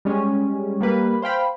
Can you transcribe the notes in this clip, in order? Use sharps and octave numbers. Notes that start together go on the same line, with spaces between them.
G3 G#3 C#4
G3 A#3 B4
C5 F5 G5 B5